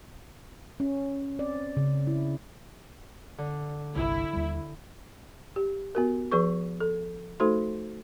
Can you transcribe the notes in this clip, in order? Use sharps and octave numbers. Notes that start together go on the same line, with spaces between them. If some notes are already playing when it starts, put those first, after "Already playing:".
C#4
C4 D5
C#3
E4
D3
G1 C2 E4
D#2 G3
G4
B3 F#4 A#4
F3 G#4 B4 C#6
A4
A3 D#4 F#4 A4 C5 C6